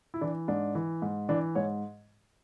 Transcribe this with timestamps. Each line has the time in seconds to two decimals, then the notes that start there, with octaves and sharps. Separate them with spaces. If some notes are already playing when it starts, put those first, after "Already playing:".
0.14 E4
0.21 E3 D4
0.48 G#2 D4
0.75 E3
1.02 G#2
1.29 E3 D4
1.55 G#2 C#5